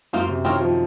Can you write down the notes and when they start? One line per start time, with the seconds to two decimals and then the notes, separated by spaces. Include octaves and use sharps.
0.13 F#2 A#3 F4 C5
0.29 C3
0.45 D#3 C4 F4 A#4 C#5
0.60 F3